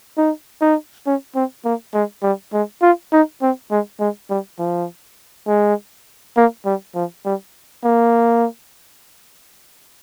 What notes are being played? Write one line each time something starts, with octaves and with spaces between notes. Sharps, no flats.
D#4
D#4
C#4
C4
A#3
G#3
G3
G#3
F4
D#4
C4
G#3
G#3
G3
F3
G#3
A#3
G3
F3
G3
A#3